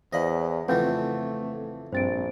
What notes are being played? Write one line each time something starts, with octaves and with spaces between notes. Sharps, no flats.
E2 C5 D5 D#5 F5 B5
F2 C#3 E3 A3 C4 B4 F#5 G6
A#1 G2 C4 C5 A6 D7